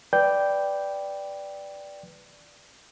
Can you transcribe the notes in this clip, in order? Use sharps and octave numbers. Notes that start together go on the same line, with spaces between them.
B4 D5 G5 G6